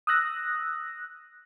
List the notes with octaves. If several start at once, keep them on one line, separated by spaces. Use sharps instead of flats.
D#6 E6 F#6 A#6